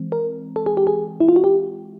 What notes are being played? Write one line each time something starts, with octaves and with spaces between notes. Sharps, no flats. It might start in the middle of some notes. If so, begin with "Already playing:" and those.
Already playing: E3 G#3 C4
A#4
A4
G#4
G4
G#4
E4
F4
F#4
G4